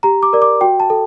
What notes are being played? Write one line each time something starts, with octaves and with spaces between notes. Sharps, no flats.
G4 A#5
D6
A#4 D5
D6
F#4 G5
A5
A4